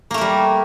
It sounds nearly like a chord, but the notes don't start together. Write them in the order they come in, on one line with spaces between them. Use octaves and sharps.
A#3 A3 A#4 G3